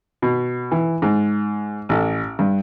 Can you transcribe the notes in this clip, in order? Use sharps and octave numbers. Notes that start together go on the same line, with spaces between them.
B2
E3
G#2
A1
G2